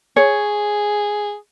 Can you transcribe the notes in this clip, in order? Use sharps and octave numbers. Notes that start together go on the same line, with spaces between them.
G#4 C#5